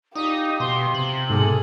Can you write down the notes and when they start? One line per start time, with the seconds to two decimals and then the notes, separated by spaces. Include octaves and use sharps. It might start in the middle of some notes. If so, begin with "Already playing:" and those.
0.15 D#4 F4 G4 D5 D6 D#6 B6
0.60 B2 C6
0.95 C3 F#7
1.30 G#2 B2 G#4 A4 F6